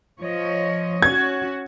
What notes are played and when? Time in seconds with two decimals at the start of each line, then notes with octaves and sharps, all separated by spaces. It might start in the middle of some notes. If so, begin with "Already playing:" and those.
0.20 F3 C#5 D#5
1.02 C#4 F#4 G#6